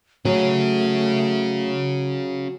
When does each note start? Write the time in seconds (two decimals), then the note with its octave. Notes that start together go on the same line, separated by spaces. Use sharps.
0.25 F#3 A3 C#4 G#4